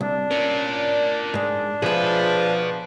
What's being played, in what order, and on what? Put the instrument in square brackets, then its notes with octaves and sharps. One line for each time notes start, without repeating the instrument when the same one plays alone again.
[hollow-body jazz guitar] C2 [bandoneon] D4
[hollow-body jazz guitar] C#4 [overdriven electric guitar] A#4 D5
[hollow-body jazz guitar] G#2 G#3
[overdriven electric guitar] B2 B4 [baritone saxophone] F3 [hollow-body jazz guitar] G#4 E5